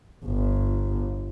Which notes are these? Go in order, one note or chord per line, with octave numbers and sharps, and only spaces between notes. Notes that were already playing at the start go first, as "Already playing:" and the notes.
G1